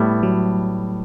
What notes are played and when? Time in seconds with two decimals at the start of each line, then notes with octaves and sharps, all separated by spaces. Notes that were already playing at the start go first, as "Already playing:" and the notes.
Already playing: A2 G3 A3 B3 E4
0.23 F#3